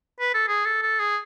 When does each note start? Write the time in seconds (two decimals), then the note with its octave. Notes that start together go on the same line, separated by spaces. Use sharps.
0.20 B4
0.34 A4
0.48 G#4
0.65 A4
0.82 A4
0.99 G#4